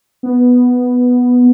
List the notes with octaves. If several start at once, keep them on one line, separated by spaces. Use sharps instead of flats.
B3